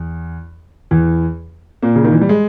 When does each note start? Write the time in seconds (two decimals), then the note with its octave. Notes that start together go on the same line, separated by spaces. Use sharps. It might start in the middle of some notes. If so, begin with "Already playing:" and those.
Already playing: E2
0.91 E2 E3
1.82 A#2 A#3
1.96 C#3
2.04 D#3
2.12 E3
2.21 G3
2.29 G#3